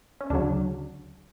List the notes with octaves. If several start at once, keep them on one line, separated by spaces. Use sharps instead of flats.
C#4
D2 C#3 F#3 D4